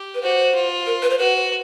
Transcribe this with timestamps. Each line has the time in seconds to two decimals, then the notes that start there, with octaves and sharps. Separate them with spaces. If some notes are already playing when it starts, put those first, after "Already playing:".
Already playing: G4
0.15 B4
0.22 F#4 C5
0.55 F4
0.86 A#4
1.02 B4
1.10 C5
1.19 F#4 B4